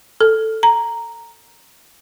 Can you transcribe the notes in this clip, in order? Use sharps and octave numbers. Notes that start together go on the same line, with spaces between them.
A4
A#5